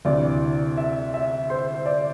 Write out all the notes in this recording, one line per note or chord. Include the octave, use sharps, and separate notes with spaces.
D2 C3 E3 D5
E5
E5
C5
D5